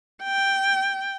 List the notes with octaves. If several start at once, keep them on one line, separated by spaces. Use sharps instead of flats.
G5